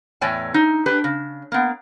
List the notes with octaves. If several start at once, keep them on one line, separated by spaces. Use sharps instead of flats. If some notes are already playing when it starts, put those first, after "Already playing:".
E2 A2 C#5 D5 G5 G#5
D#4
D4 G4 B4
C#3
A#3 B3